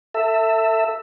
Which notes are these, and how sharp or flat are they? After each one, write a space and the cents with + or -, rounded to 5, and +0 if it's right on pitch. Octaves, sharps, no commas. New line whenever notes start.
A4 +30 E5 +0